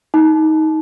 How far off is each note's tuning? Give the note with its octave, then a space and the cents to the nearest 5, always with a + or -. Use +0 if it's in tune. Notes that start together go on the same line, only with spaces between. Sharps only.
D#4 +20